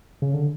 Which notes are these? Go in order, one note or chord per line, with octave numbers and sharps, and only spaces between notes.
C#3
D3